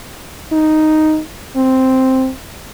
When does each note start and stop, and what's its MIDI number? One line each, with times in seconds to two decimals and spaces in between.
0.52 1.20 63
1.57 2.31 60